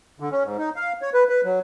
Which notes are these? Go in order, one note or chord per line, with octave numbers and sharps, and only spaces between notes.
D3
C#4
G#2
D#4
F5
C#5
B4
B4
F#3